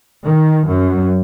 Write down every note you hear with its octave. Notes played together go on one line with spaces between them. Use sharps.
D#3
F#2